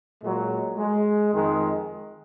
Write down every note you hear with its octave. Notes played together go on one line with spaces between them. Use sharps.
A#2 F#3 G#3
G#3
F2 D#3 G#3